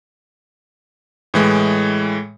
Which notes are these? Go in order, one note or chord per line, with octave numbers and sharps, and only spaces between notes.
A2 E3 G#3